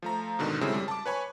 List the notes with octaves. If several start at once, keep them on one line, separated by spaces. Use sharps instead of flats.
F3 A3 A#5
G#2 B2 D3 D#3
C#3 G3 G#3 C4 E4 A4
F#2 G3
A5 D6
B4 C#5 G#5 B5 C#6